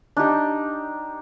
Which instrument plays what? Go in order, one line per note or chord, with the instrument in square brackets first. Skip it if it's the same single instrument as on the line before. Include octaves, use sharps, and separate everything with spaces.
[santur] D4 D#4 G4 G5